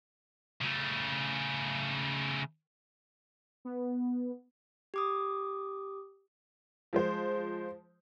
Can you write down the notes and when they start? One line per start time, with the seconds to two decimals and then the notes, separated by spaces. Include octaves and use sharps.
0.61 C#3 A3
3.65 B3
4.94 G4 D6 D#6
6.93 F3 G#3 C5